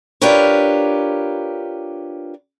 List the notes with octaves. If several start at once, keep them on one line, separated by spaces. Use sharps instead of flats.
D4 F4 G4 A#4 B4 C#5